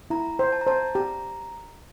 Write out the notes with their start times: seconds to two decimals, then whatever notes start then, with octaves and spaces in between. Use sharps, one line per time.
0.10 E4 A#5
0.39 C5
0.52 A5
0.61 A#5
0.67 C5 A5
0.95 G4 A#5